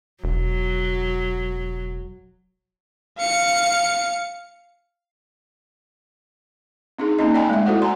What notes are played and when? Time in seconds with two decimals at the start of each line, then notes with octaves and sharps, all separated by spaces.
0.24 E1 F#3
3.18 F5 C#7
6.99 C4 D4 D#4 G#4
7.19 A#3 C4 C#4 D#4 D#5
7.34 D5 D#5 G5 G#5 B5
7.49 G#3 A3 E5
7.66 E4 F#4 A4 C5 D5 F#5
7.82 D5 F#5 G#5 A#5 C6